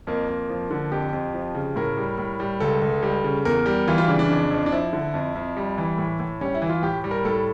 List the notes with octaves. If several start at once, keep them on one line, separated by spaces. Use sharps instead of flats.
F2 A#3
F2
F3
D3
F2 G4
F2
F3
C#3
A2 A#4
G3
A2
G3
C#2 A4
C#2
G3
C#3
E2 A#4
G3
E3 F4
F4
C#3 D4
D4
F2
F2
D4
F3 E4
D3
F2
F2
G3
E3
A2
A2
G3 C#4
E4
E3
F4
A2 G4
G3
A#4
A2 A4